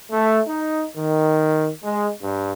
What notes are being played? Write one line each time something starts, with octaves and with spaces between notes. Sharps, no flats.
A3
D#4
D#3
G#3
G2